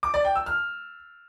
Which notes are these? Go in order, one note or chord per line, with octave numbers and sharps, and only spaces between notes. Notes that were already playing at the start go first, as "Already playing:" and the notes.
D6
D5
G5
E6
F6